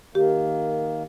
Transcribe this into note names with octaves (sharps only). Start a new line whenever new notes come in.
D#3 A#3 G4